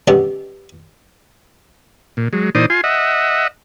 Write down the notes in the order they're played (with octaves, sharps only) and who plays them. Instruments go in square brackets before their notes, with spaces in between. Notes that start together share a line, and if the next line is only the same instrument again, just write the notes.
[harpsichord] D3 G#3 B3 C#4 G4
[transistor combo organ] A#2
F#3 G#3
A#2 E3 D#4 C5 D5 D#6
F4 G#5 C6
D#5 E5 F#5